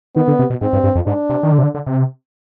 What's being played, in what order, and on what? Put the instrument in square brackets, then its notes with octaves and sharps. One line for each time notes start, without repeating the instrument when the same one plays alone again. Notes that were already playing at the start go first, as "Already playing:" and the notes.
[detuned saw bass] D#3 [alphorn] B3
[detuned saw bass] D3
C3
B2
[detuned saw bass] G#2 [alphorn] C4
[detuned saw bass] G2
G2
F2
[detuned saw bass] G#2 [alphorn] D4
[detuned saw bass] C3
D#3
D3
C3
D3
D3
C3